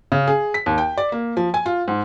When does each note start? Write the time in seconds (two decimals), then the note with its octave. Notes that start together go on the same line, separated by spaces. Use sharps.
0.12 C#3
0.27 G#4
0.54 B6
0.66 D#2
0.78 G5
0.98 D5
1.12 A#3
1.37 F3
1.54 G#5
1.66 F4
1.88 G#2